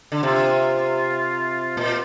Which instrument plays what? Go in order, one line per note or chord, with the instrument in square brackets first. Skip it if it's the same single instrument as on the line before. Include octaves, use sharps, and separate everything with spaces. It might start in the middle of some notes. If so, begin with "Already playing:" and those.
[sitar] D3
[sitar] C3 [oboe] F4
[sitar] A#2